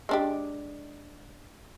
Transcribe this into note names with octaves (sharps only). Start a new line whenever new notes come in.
G#3 D4 G4